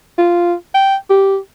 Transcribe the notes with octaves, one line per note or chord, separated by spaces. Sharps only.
F4
G5
G4